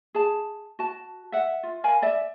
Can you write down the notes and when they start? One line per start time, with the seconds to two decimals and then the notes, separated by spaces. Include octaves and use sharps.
0.15 G#4 A5
0.79 F#4 A5
1.32 E5 F#5
1.63 F4
1.84 A#4 F5 G#5 B5
2.02 D5 E5